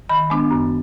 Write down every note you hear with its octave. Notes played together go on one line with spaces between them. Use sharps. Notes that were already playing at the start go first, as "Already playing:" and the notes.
D#3 B5
G#3 B3 D4
F#2